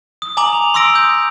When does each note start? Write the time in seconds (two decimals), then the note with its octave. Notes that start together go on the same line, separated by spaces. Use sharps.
0.22 D#6
0.37 G#5 A#5 D6 D#6 F#7
0.53 F7
0.74 C6 D#6 E6 A#6 D7
0.95 D#6 G6